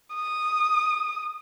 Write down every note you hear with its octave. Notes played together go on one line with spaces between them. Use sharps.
D#6